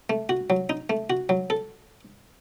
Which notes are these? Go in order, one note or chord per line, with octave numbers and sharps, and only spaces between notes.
A3
F#4
F#3
D#4
A3
F#4
F#3
A4